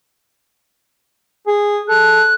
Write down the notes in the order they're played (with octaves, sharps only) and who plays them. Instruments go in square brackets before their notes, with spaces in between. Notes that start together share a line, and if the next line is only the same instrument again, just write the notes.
[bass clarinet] G#4
[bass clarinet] A4 [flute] F#6